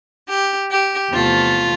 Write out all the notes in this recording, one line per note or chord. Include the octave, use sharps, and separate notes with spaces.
G4
G4
E2 C3 F3 A3 F4